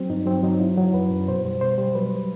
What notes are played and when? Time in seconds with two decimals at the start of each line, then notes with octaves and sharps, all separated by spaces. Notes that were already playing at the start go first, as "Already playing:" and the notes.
Already playing: F#3 C4
0.10 G2 D#4
0.26 F#3 C4
0.43 F#3 D#4
0.60 F#3 E4
0.77 F#3 F#4
0.93 F#2 B4
1.11 F#2
1.28 B2 C5
1.45 G3
1.61 B2 C5
1.78 G3
1.95 F#3 B4